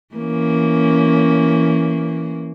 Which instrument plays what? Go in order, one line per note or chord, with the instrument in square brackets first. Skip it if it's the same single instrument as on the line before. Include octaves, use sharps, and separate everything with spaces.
[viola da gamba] E3 A#3 C#4